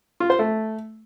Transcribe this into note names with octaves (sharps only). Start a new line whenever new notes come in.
F4
C5
A3